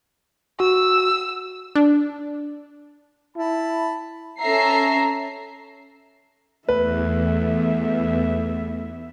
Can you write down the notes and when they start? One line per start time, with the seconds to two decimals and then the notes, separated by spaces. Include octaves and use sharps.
0.60 F#4 E6
1.75 D4
3.36 E4 A5 B5
4.39 C#4 A4 E5 A#5 C7
6.69 E2 A3 B3 B4 E5